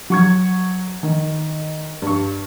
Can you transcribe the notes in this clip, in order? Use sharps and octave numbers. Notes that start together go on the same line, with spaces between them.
F#3 C#6 G#6
D#3
G2 C#6